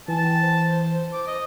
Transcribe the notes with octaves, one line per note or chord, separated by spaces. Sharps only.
E3 G#5 A5
G5
C5
D6
D#5